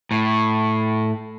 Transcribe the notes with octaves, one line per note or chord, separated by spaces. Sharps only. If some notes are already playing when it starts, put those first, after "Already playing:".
A2